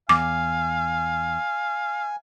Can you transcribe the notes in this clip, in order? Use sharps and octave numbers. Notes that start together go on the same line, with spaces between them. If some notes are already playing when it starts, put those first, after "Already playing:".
E2 F5 G#5 D6